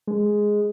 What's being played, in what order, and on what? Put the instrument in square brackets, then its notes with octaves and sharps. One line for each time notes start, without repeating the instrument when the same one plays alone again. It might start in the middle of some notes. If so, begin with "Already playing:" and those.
[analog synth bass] G#3